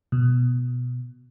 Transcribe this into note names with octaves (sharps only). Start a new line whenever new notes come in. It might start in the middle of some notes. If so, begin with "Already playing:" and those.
B2